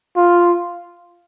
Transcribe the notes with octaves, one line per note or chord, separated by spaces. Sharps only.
F4